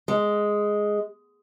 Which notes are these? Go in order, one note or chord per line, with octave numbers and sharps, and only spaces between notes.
G#3